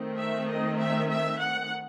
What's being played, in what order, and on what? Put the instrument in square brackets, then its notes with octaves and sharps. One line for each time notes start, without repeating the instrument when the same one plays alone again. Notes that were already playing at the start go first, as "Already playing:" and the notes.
Already playing: [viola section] D#3 A3 C4
E5
D#5
E5
E5
F#5